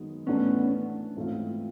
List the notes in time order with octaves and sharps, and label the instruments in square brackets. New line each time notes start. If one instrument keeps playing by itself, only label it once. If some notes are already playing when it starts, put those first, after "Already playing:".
Already playing: [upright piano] F#2 D#3 G#3 B3
[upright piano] A2 E3 A3 D4 [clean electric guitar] B3 C#4
[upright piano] G#2 E3 A3 C4 F4